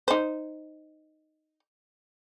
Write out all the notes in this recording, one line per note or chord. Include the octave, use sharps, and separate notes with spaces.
D#4 C5